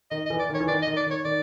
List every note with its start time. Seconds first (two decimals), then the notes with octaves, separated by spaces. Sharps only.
0.11 D#3 D#5
0.26 D#5
0.30 E3
0.40 D5
0.49 D#3
0.54 C#5
0.60 E3
0.68 D#3 D5
0.82 D#5
0.87 D#3
0.97 D5
1.06 D#3
1.11 C#5
1.25 D#3 D5